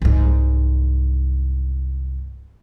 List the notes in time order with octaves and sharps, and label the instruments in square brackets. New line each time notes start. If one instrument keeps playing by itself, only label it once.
[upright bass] C2 G#2